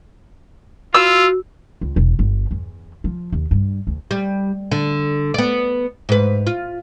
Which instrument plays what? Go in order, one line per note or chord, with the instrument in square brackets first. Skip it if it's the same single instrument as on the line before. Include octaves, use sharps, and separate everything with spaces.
[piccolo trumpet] F4 [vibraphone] F#4 [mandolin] E6
[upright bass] C#2
E1
G1
E2
F3
D#2
G2
D2
[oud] G3
D3
B3 D5
G#2 B4
F4